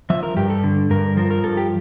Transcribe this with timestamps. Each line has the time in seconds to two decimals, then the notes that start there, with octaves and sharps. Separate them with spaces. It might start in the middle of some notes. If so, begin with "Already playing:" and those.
0.10 F3 E5
0.23 A#4
0.36 G2 G4
0.50 A4
0.64 D3
0.90 G2 A#4
1.17 F3 A#4
1.31 A#4
1.44 G2 A4
1.57 G4